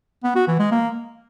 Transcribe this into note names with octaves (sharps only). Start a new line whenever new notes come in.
B3
F#4
E3
G#3
A#3